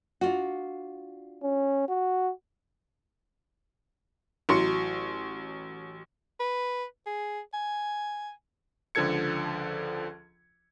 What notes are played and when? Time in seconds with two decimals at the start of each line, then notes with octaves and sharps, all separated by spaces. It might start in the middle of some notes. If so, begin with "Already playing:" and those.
0.21 D4 F4 F#4
1.43 C#4
1.88 F#4
4.49 A1 F#3 C6 C#7
6.40 B4
7.06 G#4
7.54 G#5
8.95 C#2 D3 F3 A4 G#6 C#7